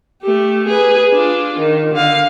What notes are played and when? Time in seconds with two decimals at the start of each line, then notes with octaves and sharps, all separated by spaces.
0.22 A3 G4
0.66 G#4 B4
1.12 D4 F4
1.59 D#3
1.94 D3 F5